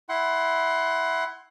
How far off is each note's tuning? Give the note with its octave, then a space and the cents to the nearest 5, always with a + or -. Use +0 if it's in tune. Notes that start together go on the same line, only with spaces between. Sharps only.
E4 +0 F#5 +20 C6 +10